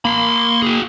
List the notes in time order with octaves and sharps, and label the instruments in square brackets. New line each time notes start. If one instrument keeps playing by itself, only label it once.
[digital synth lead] A#3 [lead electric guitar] B5 C6
[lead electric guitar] F#4 G#4